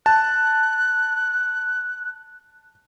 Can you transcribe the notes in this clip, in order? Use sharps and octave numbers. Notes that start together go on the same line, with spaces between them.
A5 F#6